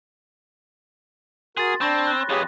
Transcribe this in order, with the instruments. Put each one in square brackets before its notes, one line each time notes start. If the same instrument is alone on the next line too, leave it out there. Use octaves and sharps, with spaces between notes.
[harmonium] F#4 A#4 [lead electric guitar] G#4 [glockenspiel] C6 A6
[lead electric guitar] C4 [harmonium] D4 [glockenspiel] B5 C#6 A#6
[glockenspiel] F#6
[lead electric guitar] F2 B4 [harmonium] G4 G#4 C#5